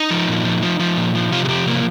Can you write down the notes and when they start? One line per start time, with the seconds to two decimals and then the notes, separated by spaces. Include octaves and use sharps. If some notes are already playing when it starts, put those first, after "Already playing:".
Already playing: D#4
0.11 F3
0.28 A#2
0.45 F3
0.63 F3
0.79 F3
0.97 A#2
1.15 F3
1.32 C3 F4
1.45 G#4
1.49 F3 G4
1.66 C3 A#3